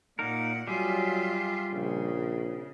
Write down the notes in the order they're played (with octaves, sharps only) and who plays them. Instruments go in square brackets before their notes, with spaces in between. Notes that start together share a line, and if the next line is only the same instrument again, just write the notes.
[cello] A#2 F#5 [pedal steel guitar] A#3 D#4 A#4
[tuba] F#3 [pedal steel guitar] G3 G#4 [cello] F4 E5
[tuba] A#1 [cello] C#3